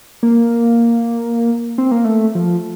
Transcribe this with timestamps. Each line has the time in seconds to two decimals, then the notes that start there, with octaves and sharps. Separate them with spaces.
0.23 A#3
1.78 C4
1.91 A#3
2.05 A3
2.35 F3